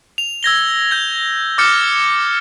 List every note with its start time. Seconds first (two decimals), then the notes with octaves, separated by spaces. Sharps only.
0.18 F7
0.43 E6 G#6 A#6 G7
0.91 G6 G#6
1.58 D6 F6 G6 A6 C#7